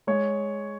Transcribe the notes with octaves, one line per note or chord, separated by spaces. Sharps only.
G#3 C#5